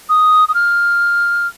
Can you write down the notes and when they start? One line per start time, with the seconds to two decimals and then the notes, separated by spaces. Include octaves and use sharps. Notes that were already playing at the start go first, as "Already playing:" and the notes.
0.09 D#6
0.48 D#6
0.54 F6